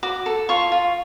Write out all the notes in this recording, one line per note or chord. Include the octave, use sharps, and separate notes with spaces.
F#4 D6
A4
F4 C#6
F4